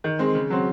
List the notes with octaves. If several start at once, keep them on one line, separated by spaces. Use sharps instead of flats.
D#3
G#3 C4
C#3
F#3 C4